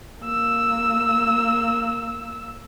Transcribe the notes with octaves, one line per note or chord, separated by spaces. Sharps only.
A#3 E6